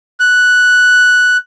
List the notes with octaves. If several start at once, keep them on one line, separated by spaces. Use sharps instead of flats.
F#6